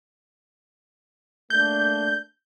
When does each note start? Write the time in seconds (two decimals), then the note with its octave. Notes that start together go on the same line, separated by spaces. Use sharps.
1.50 A3 A#3 D4 G6